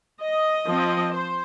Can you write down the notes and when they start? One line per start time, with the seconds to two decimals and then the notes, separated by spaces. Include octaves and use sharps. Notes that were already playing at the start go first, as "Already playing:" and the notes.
0.21 D#5
0.68 F3 C4
1.14 C5